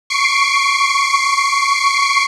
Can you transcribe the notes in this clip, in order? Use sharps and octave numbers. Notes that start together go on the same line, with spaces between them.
C#6 C7 D7